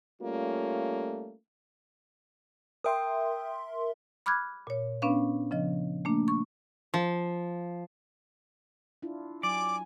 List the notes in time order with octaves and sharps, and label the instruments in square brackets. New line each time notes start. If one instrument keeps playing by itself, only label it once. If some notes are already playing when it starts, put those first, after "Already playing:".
[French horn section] G3 A3 A#3 C#4 F4
[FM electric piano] A#4 E5 C6 [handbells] G5 D#6
[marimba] B5 D6 F6 F#6 G#6
A#2 C#5
B3 C#4 D4 B4 F5
C#3 F3 D#5
A3 A#3 D4
C#6
[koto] F3
[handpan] D4 E4 F4
[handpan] F#3 [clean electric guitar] D5 [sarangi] G#5 [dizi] D6